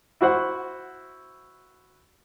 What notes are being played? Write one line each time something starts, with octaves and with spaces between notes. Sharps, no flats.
E4 F#4 C5 F#5